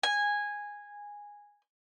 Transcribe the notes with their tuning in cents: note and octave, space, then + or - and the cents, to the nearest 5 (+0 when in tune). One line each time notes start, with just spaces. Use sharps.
G#5 -10